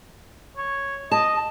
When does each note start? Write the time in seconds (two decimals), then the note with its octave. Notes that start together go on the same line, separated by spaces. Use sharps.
0.57 C#5
1.11 D#5 A5